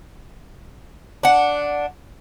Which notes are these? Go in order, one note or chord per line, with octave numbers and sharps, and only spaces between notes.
D4 F#5